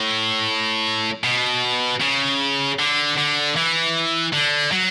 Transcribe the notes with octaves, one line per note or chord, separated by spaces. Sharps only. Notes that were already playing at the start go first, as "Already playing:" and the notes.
Already playing: A2
B2
C#3
D3
D3
E3
D3
F#3